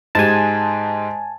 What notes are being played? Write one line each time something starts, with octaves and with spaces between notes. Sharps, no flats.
G#2 G#3 G4 G#5 A5